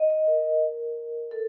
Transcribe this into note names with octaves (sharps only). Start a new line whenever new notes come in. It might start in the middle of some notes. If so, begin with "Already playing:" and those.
Already playing: D#5
D#5
A#4
A4